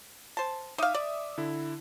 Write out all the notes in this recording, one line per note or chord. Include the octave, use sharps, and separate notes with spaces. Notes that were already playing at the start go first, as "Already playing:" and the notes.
C5 A5
D#4 E5 F5 D6 D#6
D5
D3 E4